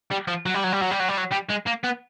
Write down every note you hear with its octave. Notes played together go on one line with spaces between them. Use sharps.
G3
F3
F#3
G3
F#3
G3
F#3
G3
F#3
G3
F#3
G3
G#3
A#3
B3